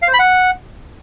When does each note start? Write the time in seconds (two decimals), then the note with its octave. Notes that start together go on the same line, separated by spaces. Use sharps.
0.02 F5
0.08 C5
0.14 B5
0.19 F#5